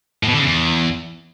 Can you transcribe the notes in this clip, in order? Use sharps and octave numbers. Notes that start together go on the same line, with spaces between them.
A2
B2
D3
C#3
E2